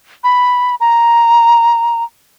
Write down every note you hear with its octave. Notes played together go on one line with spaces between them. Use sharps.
B5
A#5